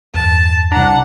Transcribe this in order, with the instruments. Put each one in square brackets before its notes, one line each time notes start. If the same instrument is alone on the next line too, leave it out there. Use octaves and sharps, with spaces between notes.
[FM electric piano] E2 G2 [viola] A5
[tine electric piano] C2 A#5 [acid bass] D4 [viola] F#5